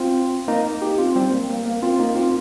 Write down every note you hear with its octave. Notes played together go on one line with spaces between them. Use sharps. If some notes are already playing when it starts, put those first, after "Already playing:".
Already playing: C4 F4
A#3 D#4
D#4 G4
C4 F4
G3 C4
A#3
A#3
A#3
C4 F4
A#3 D#4
C4 F4